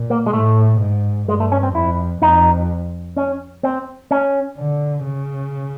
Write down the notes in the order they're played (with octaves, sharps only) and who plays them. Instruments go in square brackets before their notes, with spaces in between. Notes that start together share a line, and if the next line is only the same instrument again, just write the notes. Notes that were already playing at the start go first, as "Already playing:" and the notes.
Already playing: [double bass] A#2
[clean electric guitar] A#3
G#3
[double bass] A2 [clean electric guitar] A3
[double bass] G#2
[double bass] G2 [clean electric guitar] G#3
[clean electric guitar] A3
C#4
C4
[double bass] F2 [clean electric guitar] E4
[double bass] F2 [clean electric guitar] D#4
[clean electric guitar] C#4
C4
C#4
[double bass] D3
C#3